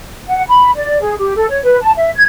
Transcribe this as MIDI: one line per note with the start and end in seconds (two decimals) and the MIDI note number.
0.26 0.42 78
0.47 0.69 83
0.75 1.00 74
1.01 1.13 68
1.18 1.34 67
1.36 1.47 69
1.48 1.62 73
1.63 1.76 71
1.81 1.91 81
1.97 2.10 76
2.15 2.24 92